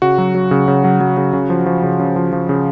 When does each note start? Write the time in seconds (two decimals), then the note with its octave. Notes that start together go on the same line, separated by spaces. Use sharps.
0.02 C#3 F#4
0.18 F#3
0.35 F#3
0.51 C#3
0.68 C#3
0.84 F#3
1.01 F#3
1.17 C#3
1.33 C#3
1.50 F3
1.66 F3
1.83 C#3
1.99 C#3
2.16 F3
2.33 F3
2.49 C#3